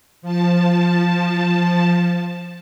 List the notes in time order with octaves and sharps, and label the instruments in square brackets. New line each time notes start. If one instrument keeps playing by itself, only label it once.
[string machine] F3 A5